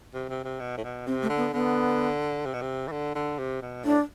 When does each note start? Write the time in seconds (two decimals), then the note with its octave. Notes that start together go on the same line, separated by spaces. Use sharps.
0.14 C3
0.29 C3
0.44 C3
0.60 B2
0.77 A2
0.84 B2
1.07 C3 C4
1.22 A3
1.29 D3
1.37 B3
1.52 D3 B3
2.46 C3
2.54 B2
2.62 C3
2.88 E3
2.92 D3
3.15 D3
3.39 C3
3.62 B2
3.84 A2 D4